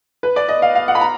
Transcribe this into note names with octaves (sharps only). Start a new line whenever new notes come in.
B4
D5
D#5
F5
F5
F#5
B5
A#5